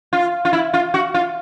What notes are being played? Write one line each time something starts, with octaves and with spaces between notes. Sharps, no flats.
F4
F4
E4
F4
F#4
F4